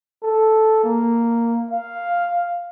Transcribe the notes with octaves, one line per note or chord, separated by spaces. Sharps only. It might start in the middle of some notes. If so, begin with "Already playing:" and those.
A4
A#3
F5